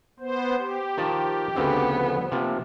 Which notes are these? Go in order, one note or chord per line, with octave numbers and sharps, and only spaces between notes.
B3 C5
G4
D#3 F3 A5
D2 C#3 B3 C4
F3
C3 F3 A#3